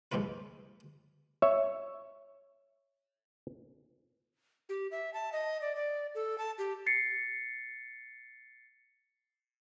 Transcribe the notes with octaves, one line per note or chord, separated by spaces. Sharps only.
C2 G#2 F3 A#3 F4 B4
C#5 E5
G4
E5
A5
D#5
D5
D5
A4
A5
G4
A6 C7 C#7